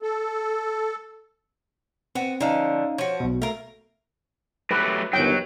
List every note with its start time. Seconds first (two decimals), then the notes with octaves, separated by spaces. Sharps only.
0.02 A4
2.15 B3 C4 F#4
2.41 D3 F3 C#4 D#4 F5
2.98 F3 F#4 C#5
3.20 B1 B2
3.42 A3 A#4 F5
4.71 F#3 A3 G4 B4
5.13 G1 D#2 F#3 G5